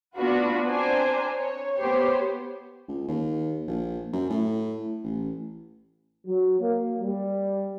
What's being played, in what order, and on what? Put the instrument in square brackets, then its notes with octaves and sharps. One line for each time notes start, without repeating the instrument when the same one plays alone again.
[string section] B3 D4 F4 F#4 B4
C4 D4 C5 G#5 A#5
C#5
B3 G4 C5 C#5
[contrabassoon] C#2
D#2
A#1
F#2
A2
A1
[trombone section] F#3
A#3
G3